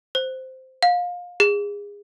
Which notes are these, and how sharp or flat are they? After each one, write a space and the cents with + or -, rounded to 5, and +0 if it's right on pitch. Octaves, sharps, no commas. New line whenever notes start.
C5 -5
F5 +25
G#4 -25